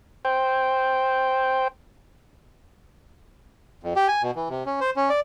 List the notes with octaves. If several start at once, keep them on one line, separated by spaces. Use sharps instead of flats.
C5 G5
F2
G4
G#5
B2
E3
C3
C#4
C5
C#4
D5